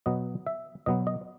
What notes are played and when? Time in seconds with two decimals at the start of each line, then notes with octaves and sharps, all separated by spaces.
0.06 B2 F#3 B3 D#5
0.47 E5
0.86 B2 F#3 B3 D#5
1.07 D#5